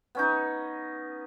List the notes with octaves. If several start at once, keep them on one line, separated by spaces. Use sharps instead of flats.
B3 C#4 D#4